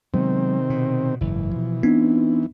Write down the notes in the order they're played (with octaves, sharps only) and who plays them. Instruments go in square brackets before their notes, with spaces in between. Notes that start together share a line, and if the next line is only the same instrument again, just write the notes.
[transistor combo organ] C3 D#3 C4 [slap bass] F#3 G#3 B3
[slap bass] B2
[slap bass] F#1 G#2 [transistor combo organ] E3
[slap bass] B2 F3
[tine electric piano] B3 D4 D#4 [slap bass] C4